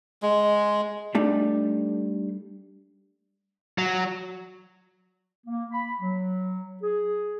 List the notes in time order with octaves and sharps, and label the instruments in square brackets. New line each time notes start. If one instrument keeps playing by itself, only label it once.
[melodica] G#3
[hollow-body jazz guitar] G3 A3 D4 D#4
[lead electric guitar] F#3
[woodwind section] A#3
B5
F#3
G#4